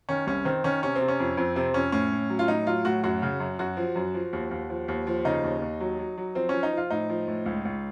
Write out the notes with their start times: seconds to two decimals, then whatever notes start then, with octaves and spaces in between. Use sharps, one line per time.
0.09 D#3 C#4
0.27 C2 C#4
0.45 D#3 C4
0.64 D#3 C#4
0.82 C3 C#4
0.95 C4
1.01 C3
1.08 C#4
1.20 F2
1.37 F2 C4
1.56 C3 C4
1.74 F2 C#4
1.92 A2 C#4
2.12 A2
2.30 F#3
2.39 F4
2.48 A2 D#4
2.66 F#3 F4
2.85 A2 F#4
3.04 F#2 F#4
3.22 C#3
3.40 F#2
3.59 F#2 F#4
3.77 F3
3.96 F#2
4.14 F3
4.33 D#2
4.51 D#2
4.70 F3
4.88 D#2
5.07 F3
5.25 C#3 D#4
5.44 D#2
5.62 D#2
5.80 F#3
5.99 F#3
6.18 F#3
6.35 F3 C4
6.49 F3 C#4
6.63 D#4
6.73 F3 F4
6.91 A2 D#4
7.09 F3
7.28 A2
7.46 C#2
7.65 C#2